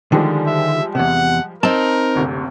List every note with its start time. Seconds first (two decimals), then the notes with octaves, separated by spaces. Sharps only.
0.12 D3 D#3 F3 G3 G#3
0.47 E5
0.95 E2 C3 F#5
1.63 C4 D#4 A#4 A5
2.15 F#1 D2 C3